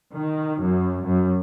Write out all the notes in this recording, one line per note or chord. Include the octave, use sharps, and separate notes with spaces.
D#3
F#2
F#2